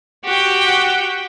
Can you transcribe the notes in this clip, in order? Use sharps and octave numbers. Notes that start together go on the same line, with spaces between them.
F#4 G4 G5